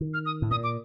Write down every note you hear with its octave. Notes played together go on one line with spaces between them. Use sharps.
D#3
F6
D#6
A2
A#2 D#6
D6